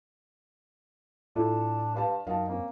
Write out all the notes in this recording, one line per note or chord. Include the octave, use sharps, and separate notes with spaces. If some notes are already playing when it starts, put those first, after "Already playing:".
A2 D4 E4 F4 A4
G2 B4 F5 A5
F#2 D#3 F5 A5
A#3 C4 C#4